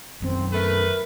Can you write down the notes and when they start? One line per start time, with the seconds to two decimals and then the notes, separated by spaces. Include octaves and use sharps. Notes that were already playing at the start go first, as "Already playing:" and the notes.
0.22 F#2 D#3 C4
0.52 A3 A#4 B4